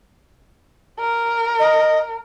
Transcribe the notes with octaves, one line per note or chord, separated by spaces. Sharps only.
A#4
D#5